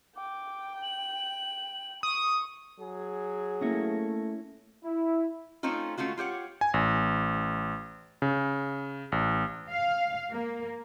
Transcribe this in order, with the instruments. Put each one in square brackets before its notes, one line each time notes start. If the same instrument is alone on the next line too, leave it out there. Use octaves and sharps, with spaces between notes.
[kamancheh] G5 [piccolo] D6
[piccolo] F#7
[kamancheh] C#6 [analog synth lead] D#6
[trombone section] F#3 G#4
[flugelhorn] A3 [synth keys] A#3 A#6 [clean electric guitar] C#4 E4 C#5
[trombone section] E4
[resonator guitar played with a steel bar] A3 C4 C#4 D#4 F4
G#3 A3 C#4 F4 F#4
F4 G4 C#5 F#5
[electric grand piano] G#5
A1
C#3
A1
[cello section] F5
A#3